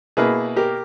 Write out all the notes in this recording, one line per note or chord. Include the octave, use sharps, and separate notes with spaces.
B2 A#3 E4 G#4 B4
G4 A#4